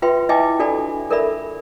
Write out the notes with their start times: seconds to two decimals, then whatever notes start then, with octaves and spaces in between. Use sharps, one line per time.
0.02 F4 B4 E5 G5 C6
0.29 E4 D#5 E5 G5 G#5 D6
0.59 D4 F#4 A4 D5 G#5 B5
1.10 A4 A#4 D5 E5 B5